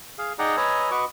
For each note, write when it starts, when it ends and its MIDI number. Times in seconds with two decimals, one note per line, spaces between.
0.18 0.33 68
0.18 0.33 77
0.39 0.56 63
0.39 0.56 68
0.39 0.56 74
0.39 0.56 78
0.39 0.56 79
0.39 0.56 82
0.57 0.90 71
0.57 0.90 73
0.57 0.90 75
0.57 0.90 80
0.57 0.90 82
0.57 0.90 88
0.91 1.05 66
0.91 1.05 71
0.91 1.05 75
0.91 1.05 85
0.91 1.05 86